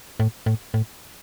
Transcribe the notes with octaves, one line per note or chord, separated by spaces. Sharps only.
A2
A2
A2